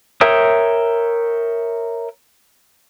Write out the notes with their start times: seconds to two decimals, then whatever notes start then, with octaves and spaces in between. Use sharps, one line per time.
0.21 A#4 C#5 E5 G5 D#6